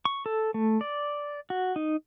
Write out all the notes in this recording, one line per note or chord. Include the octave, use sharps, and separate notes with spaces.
C#6
A4
A3
D5
F#4
D#4